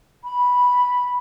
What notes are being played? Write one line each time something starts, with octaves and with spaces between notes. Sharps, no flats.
B5